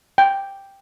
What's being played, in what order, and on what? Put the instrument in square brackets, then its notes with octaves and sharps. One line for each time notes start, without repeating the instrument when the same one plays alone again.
[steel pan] G5